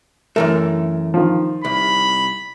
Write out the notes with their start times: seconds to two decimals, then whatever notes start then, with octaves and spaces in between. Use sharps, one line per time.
0.36 F#2 E3 A3 A#4
1.14 D#3 F3
1.65 C2 B5